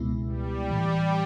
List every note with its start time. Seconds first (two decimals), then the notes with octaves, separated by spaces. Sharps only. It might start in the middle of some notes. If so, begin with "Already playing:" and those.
Already playing: C#2 B2 G#3 B3 E4
0.27 G3
0.70 A2 E3